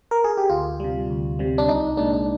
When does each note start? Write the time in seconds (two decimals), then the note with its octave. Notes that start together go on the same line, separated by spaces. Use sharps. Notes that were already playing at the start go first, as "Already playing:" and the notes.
0.11 A#4
0.24 G#4
0.37 G4
0.50 D2 F4
0.80 C3 G3
1.10 D2
1.39 C3 G3
1.58 D4
1.68 C2 D#4
1.97 A#2 G#3 D4
2.13 D4